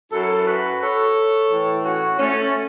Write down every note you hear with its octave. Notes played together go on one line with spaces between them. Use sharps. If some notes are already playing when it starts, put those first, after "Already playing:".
F#2 F#3 E4 A4
F#4 B4
A4 C#5
A2 E3
C#4 F#4
A3 C#4